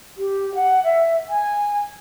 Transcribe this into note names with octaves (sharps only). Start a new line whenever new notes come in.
G4
F#5
E5
G#5